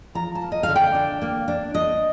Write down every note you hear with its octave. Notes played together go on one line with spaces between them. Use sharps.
F3 A#5
A5
A#3
D#5
D3 F5
G5
D4
A#3
D4
D4 D#5